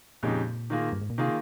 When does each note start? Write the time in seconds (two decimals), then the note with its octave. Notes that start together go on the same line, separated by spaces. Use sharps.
0.23 F2 A#2 C#3 G#3 D#4 G4
0.70 D#3 A#3 F4 G#4
0.92 G2
1.02 G#2
1.10 A#2
1.18 C3 D#3 A#3 F4 G#4